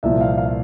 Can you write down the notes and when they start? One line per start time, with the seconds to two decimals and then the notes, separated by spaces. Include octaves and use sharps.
0.03 C2 A#2 F3 E5
0.21 F5
0.38 F5